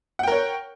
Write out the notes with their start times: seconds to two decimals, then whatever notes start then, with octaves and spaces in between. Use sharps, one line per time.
0.19 F#5
0.23 G5
0.28 A#4
0.32 C#5